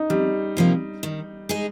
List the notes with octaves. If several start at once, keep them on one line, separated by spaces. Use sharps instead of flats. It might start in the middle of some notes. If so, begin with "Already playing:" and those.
Already playing: D#4
F2 G3
C3 F3 A#3
D#3
G#3 D#4 G#4